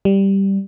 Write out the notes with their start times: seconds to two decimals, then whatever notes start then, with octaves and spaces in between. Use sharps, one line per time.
0.05 G3